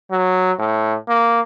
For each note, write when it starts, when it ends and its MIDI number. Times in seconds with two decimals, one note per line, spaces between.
0.11 0.52 54
0.59 0.96 45
1.08 1.40 58